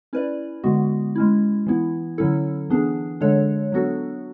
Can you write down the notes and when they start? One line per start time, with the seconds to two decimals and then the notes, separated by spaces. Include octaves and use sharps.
0.13 C#4 E4 B4 D5
0.64 D3 G#3 B3 F#4
1.16 G#3 C#4 E4
1.67 E3 B3 E4
2.18 D3 F#3 C#4 E4 A4
2.70 E3 B3 D4 G#4
3.21 D3 G#3 D4 A4 C#5
3.72 F#3 B3 D4 F#4 A4